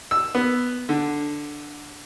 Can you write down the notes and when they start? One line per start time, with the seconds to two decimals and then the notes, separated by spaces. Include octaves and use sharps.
0.11 E6
0.35 B3
0.89 D3